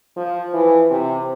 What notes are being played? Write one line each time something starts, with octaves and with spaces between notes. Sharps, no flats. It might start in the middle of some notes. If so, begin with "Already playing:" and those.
F3
E3
C3